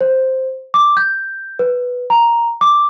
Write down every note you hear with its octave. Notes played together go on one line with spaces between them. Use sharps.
C5
D6
G6
B4
A#5
D6